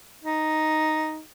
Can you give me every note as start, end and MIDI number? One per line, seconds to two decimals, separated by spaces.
0.23 1.21 63